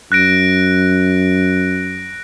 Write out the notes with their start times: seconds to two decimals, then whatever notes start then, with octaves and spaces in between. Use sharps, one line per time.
0.12 F#2 F#6 A#6 D7